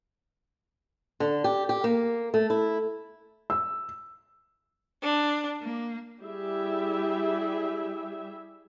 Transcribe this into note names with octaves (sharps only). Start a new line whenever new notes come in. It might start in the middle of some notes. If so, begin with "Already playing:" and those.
D3
G4
G4
A#3
A3
E4
E6
D4
A#3
G3 E4 G4 G#4 E5